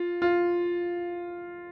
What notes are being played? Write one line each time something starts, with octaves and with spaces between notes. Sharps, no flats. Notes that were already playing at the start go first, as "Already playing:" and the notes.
Already playing: F4
F4